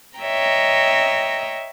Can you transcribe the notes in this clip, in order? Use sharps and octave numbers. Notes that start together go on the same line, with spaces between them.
C#5 D#5 E5 G5 A#5